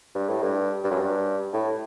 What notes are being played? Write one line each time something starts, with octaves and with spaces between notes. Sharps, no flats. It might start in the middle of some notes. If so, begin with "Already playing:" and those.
G2
A2
G2
G2
F#2
G2
A2